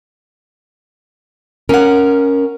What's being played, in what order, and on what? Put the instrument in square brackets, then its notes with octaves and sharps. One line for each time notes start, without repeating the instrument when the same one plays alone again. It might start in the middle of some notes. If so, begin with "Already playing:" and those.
[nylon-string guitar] C#4 F#5 [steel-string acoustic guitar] A#4